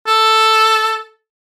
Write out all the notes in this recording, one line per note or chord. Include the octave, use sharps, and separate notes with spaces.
A4